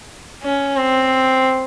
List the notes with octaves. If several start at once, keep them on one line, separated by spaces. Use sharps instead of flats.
C#4
C4